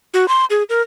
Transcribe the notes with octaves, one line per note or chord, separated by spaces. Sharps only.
F#4
C6
G#4
A#4